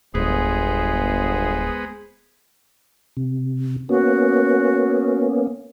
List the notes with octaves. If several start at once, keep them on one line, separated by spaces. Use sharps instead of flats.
D1 G1 G#3 B3 G#4 C5
C3
A#3 B3 C#4 F#4